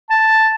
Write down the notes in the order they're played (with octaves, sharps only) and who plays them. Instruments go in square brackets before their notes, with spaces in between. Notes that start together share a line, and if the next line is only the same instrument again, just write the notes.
[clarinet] A5